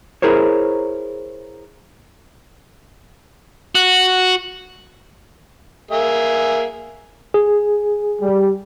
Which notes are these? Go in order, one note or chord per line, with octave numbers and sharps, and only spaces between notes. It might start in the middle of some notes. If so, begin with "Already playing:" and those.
E4 G#4 A#4 C5 C#5
F#4
A#3 G#4 E5
G#4
G3